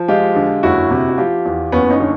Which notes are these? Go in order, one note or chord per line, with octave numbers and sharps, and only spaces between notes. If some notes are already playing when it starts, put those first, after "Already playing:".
Already playing: F3
G#3 F4 G4
D3
F#1 E4 F#4
C3
F#4
F3 F4 G4
E2
F#1 B3 C#4
C#4 D#4
D3